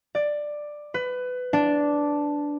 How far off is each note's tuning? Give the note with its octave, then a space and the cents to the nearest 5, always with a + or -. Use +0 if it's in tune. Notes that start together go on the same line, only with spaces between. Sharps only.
D5 +10
B4 +20
D4 -5